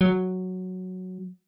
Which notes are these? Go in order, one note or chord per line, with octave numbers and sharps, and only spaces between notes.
F#3